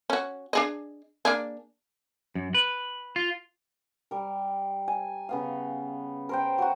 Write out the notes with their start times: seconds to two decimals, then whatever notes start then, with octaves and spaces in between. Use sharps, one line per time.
0.10 C#4 F#4
0.53 D4 G#4 D#5
1.25 A#3 D4 G#4
2.35 F#2
2.54 B4
3.16 F4
4.11 G3 A#4
4.88 G#5
5.29 C#3 B3 F5
6.29 A#4 C5 G5
6.58 F#3 F#4